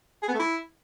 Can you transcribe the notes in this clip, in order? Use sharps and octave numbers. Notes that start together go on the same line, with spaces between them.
G#4
B3
A3
E4